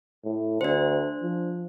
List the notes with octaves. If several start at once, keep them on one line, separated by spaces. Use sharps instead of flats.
A2
D2 D4 C5
F3